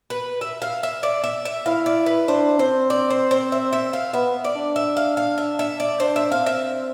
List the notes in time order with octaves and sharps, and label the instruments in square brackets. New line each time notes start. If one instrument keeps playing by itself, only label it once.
[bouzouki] B4
E5
F5
E5
D5
E5
E5
[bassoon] E4 [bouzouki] F5
[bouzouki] D5
B4
[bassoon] D4 [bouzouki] C5
[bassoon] C4 [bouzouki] C5
[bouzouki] D5
C5
C5
E5
E5
F5
[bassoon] B3 [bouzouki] E5
[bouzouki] D5
[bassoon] D4
[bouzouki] E5
F5
F5
E5
E5
D5
[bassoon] D4 [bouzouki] C5
[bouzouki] E5
[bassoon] C4 [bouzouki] F5
[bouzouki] E5